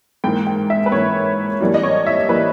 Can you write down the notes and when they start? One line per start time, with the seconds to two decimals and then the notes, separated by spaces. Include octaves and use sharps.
0.24 G#2 E3 A#3 G5
0.47 G5
0.70 E5
0.86 B4
0.92 G#2 E3 A#3 C#5
1.60 G2 E3 G3 A#3
1.74 D#5
1.83 C#5
2.07 E5
2.29 E3 G3 A#3 B4